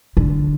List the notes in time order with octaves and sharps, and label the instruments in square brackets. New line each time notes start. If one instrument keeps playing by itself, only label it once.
[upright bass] D3